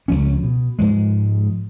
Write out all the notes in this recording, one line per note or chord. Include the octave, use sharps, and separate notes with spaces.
C#2 F#2 F3 C#4
B2
G#2 F3 G#3